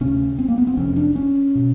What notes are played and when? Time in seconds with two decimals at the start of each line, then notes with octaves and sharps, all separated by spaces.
0.01 D2 C3 C#4
0.38 C4
0.48 A#3
0.58 B3
0.67 C4
0.77 F1 F2 C3 C#4
0.96 D4
1.16 C#4
1.55 B2